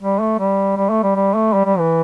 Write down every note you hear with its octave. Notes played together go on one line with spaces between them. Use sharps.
G3
A3
G3
G3
A3
G3
G3
A3
G3
G3
E3